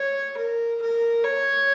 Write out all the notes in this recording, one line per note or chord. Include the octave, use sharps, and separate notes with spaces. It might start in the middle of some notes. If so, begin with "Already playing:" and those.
Already playing: C#5
A#4
A#4
C#5